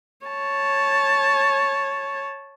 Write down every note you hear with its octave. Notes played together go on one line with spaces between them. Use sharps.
C#5 A5